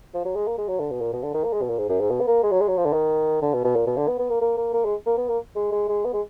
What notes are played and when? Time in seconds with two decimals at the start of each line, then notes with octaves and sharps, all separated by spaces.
0.14 F3
0.25 F#3
0.35 G#3
0.47 A#3
0.58 G#3
0.68 F#3
0.80 D3
0.91 B2
1.01 A#2
1.13 B2
1.23 D3
1.34 D#3
1.45 A#3
1.53 G#3
1.62 B2
1.70 A#2
1.78 G#2
1.89 F#2
2.00 G#2
2.10 B2
2.21 B3
2.27 A#3
2.44 G#3
2.51 F#3
2.61 G#3
2.68 F#3
2.77 F3
2.86 D3
2.93 D#3
3.42 D3
3.54 B2
3.65 B2
3.76 A#2
3.87 B2
3.97 D3
4.08 B3
4.19 B3
4.30 A#3
4.41 A#3
4.57 A#3
4.73 A#3
4.85 G#3
5.06 A#3
5.18 B3
5.29 A#3
5.56 G#3
5.72 G#3
5.89 G#3
6.05 B3
6.13 G#3